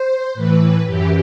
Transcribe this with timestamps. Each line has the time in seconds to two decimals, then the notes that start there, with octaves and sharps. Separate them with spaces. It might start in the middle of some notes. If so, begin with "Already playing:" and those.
Already playing: C5
0.34 A2 E3 B4
0.87 F#2 E3 G4